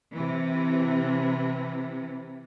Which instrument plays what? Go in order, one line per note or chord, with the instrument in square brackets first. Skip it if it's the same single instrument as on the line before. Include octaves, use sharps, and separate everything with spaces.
[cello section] C3 E3